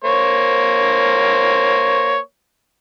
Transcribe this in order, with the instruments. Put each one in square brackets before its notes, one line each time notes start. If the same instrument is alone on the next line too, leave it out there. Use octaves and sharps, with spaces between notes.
[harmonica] A#3 C5 C#5